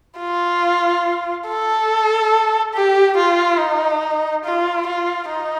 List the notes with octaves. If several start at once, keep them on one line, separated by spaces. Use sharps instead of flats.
F4
A4
G4
F4
D#4
F4
F4
D#4